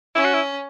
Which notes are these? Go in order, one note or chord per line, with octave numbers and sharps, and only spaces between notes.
C#4 E4
F#4
E4